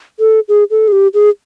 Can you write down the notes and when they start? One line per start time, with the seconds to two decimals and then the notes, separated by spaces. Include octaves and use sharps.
0.20 A4
0.49 G#4
0.71 A4
0.88 G#4
0.92 G4
1.14 G#4